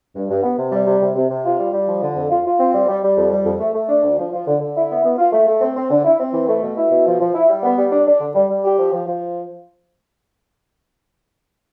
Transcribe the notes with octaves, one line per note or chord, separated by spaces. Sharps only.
G2
G2
B3
C3
G3
C3
C3
C3
C3
F4
G3
G3
F3
D3
F2
F4
F4
C4
G3
G3
G3
F2
G3
F2
A3
A3
D4
D2
F3
F3
D3
D3
E4
B3
B3
F4
A3
A3
C4
C4
D3
E4
C4
E3
A3
B2
E4
B2
F3
F3
E4
G3
B3
G3
D4
D4
D3
G3
G3
G4
F3
F3
F3